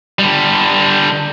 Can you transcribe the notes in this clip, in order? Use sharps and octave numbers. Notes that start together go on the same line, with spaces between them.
D3 G3